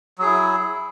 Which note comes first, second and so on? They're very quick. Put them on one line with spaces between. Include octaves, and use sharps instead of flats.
F#3 G#4 E4